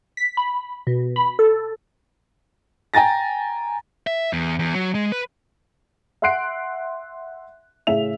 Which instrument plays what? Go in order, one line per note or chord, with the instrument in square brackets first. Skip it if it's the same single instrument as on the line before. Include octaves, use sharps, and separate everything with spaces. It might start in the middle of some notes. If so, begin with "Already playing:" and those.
[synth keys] B6
B5
B2
B5
A4
[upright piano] G5 G#5 A#5 A6 A#6
[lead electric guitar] E5
E2
E2
F#3
G#3
B4
[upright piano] E5 F#5 C6 F#6 C7 D7
A2 C#3 E5 F7